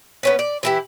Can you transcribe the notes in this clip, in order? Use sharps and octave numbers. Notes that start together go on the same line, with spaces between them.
B3 C#4 B4
D5
E3 E4 G4